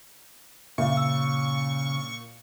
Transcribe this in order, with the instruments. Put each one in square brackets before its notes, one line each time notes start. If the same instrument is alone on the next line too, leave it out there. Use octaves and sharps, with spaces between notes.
[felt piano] A#2 [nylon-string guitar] C#3 [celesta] E5 [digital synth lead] C#6
[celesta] E6